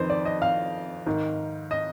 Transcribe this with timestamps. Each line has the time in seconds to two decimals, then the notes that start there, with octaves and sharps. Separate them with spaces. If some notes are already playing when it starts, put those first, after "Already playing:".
Already playing: F2 D#3 B4 C5
0.10 D5
0.25 D#5
0.42 F5
1.06 G#2 D#3
1.71 D#5